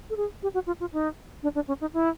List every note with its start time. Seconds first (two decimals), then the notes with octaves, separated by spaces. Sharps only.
0.10 A4
0.17 G#4
0.43 G4
0.54 F#4
0.67 F4
0.80 F4
0.93 D#4
1.43 D4
1.55 D4
1.68 C#4
1.81 D#4
1.94 E4